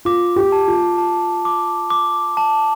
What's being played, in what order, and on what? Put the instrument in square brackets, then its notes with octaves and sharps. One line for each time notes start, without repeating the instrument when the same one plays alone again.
[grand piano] F4 [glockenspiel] D6
[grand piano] G4
[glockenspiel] A5
[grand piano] F4
[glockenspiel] A5
D6
D6
A5